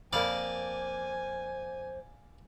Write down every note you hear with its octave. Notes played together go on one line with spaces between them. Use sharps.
F2 A#3 C5 D5 F5 G#5